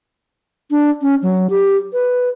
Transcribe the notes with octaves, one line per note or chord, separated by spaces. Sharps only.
D4
C#4
F#3
G4
B4